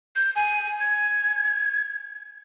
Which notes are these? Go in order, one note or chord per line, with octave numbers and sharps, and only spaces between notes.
G6
G#5
G#6